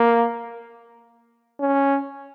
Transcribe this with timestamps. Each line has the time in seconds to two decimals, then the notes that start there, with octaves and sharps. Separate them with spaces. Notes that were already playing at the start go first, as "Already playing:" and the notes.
Already playing: A#3
1.60 C#4